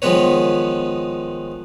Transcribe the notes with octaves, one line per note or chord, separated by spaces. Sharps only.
D#3 F3 G#3 B3 B4 C#5